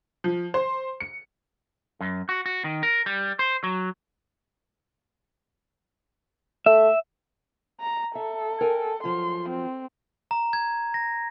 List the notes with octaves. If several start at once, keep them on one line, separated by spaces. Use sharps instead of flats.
F3
C5
C#7
F#2
F#4
F#4
D#3
A#4
G3
C5
F#3
A3 E5
A#5
A4 E5
A#4 G5 G#5
F#2 F3 F4 C6
C4
A#5
G#6
A#6